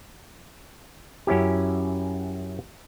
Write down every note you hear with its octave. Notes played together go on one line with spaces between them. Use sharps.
F#2 C#4 E4 G4